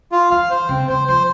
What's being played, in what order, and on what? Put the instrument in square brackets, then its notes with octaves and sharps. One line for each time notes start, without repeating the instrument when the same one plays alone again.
[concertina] F4
[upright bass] E3 [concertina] F5
[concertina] C5
[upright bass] C#3 [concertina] C4
[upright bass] C3
[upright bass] C#3 [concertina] C5
[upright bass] F3 [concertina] C5